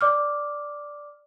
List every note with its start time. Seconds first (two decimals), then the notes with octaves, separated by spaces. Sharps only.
0.01 D5 D6 F6